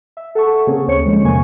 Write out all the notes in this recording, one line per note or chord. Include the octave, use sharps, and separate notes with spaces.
E5
A4 F#5 A5 C#6
C#3 A#3 C4 C#4 G#4
D2 C4 C5 C#5 C#6 C#7
D3 F3 G#3
E2 C3 A#3 G#5 C#6